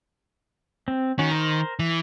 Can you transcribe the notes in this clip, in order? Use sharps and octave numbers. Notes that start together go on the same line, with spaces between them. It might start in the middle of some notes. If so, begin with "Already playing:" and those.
C4
D#3 C#4 F#4
A#4 C5
E3